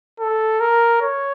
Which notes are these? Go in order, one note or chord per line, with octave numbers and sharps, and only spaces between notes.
A4
A#4
C#5